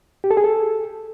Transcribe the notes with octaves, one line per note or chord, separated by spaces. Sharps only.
G4
A4
G#4
A4